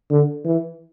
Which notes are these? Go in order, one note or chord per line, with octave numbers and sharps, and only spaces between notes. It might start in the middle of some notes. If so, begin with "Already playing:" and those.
D3
E3